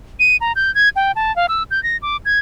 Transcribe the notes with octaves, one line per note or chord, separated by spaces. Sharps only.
D#7
A#5
G6
G#6
G5
A5
F5
E6
G6
A#6
D6
G#6